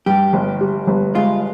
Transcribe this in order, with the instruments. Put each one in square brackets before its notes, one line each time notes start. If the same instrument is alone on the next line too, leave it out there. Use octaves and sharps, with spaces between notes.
[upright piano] G2 [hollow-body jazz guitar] G4
[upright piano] G1
G3
G1
[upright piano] G#3 [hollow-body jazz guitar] F4